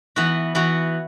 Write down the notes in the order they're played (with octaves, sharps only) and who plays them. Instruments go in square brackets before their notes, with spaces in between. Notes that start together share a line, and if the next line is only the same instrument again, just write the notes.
[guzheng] E3 B3 F#4
E3 B3 F#4